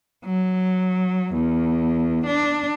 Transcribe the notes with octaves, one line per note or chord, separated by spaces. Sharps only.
F#3
E2
D4